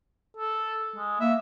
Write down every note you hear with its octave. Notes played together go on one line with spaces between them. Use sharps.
A4
G#3
A#3 E5